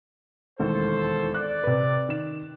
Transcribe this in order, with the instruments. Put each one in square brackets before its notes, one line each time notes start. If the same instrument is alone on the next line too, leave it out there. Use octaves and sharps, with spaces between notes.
[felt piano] E1 D#2 A2 [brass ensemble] A4 C5
[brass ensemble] D5 [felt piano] F#6
[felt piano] C3 B4
D#3 E7